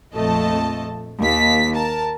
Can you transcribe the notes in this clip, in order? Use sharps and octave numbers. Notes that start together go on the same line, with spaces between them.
A#1 F2 A3 D#5 A5
D#2 B6
A#4 A5